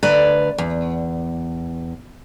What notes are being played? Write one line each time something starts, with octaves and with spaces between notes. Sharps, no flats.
D2 B4 D5 A#5
E2